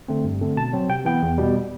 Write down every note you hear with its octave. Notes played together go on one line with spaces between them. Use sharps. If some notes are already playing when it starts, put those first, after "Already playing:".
D3 A3 C4
G2
D3 A3 C4
B2 A5
F#3 C4
C3 G5
E3 B3 G5
E2
B2 G3